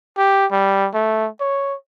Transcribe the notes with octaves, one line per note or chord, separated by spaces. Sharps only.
G4
G3
A3
C#5